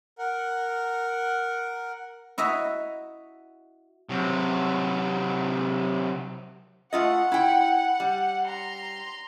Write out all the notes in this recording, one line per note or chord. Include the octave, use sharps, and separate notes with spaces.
A#4 F#5
E4 F#4 D#5 E5 A#5
C3 F#3
A3 F4 D#5 F#5
E4 G5
G3
A#5 C6